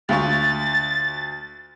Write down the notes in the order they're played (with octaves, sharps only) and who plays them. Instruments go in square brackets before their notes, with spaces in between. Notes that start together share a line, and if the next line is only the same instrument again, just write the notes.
[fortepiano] D2 F4 C#6 [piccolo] A6